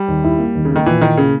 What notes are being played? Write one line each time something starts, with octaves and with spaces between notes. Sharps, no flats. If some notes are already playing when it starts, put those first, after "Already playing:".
Already playing: G3
D#2
E4
A#3
D#2
C#3
A#3
D#3
A#2 E3
D#3 E4
C#3 A#3